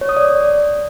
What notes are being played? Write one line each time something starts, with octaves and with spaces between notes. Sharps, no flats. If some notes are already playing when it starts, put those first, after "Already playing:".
C#5
D#6
D5